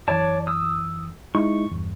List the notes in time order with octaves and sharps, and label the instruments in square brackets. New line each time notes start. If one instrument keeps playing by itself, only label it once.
[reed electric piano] F#2 E3 [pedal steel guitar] C#5 D5 A5
[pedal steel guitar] D#6 E6
[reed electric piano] G#3 D#4 E4 [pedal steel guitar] C#6
[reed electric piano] E2 G2